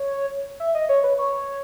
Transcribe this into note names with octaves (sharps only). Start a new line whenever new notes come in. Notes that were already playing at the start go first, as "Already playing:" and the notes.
Already playing: C#5
E5
D#5
C#5
B4
C#5